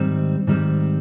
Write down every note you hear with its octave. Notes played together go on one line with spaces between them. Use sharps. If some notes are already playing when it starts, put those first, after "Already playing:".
Already playing: G#2 D#3 G3 C4
G#2 D#3 G3 C4